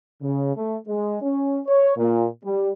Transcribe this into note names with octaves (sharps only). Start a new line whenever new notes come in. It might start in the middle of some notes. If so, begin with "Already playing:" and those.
C#3
A3
G#3
C#4
C#5
A#2
G3